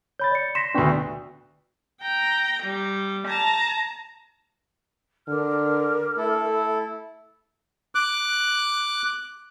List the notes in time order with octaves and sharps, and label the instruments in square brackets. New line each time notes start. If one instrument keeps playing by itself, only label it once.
[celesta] C#5 B5 [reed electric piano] G6 A6
[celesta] D5 C#7
[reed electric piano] C6 [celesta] A#6 B6 E7
[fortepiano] D2 B3 [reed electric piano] D4 G5 C#6
[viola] G5 A#5
G3
A5 A#5
[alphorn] D3 [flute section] D4 A#4 F6
[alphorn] A3 [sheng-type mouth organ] E4 A4
[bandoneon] D6 F#6